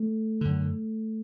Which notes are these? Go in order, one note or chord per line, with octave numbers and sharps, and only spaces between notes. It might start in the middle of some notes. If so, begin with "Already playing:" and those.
Already playing: A3
F#2 D3